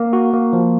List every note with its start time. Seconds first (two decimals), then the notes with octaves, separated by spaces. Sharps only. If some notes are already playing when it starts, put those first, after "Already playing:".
Already playing: A#3
0.13 F#4
0.33 A#3
0.53 F3